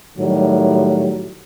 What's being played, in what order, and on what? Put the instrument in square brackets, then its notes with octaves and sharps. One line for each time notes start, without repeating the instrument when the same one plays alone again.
[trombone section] A2 D#3 F#3 G3